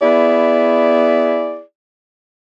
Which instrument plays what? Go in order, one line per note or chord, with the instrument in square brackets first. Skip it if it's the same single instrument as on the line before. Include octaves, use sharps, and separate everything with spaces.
[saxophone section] B3 E4 G#4 D5